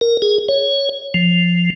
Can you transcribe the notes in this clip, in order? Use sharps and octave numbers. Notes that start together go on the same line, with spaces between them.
A#4
G#4
C#5
F3